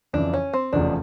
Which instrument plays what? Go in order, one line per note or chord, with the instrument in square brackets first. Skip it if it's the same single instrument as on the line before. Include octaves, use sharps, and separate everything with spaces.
[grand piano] F2 C#3 E3 [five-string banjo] D4
[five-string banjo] C#4
C4
[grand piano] F1 E2 C#3 F3 [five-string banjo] D4